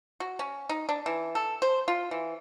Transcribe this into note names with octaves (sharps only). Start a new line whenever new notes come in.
F#4
C#4
D#4
D4
E3
A4
C5
F4
E3